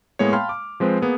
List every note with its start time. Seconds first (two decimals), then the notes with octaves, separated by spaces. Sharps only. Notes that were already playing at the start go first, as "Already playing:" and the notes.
0.19 A2 G#3 A#3 B3 C#5
0.33 F5 G5 A5 B5 C6 F6
0.49 D6
0.80 F3 G#3 C4 B4 C5
1.02 A#3 B3 G#4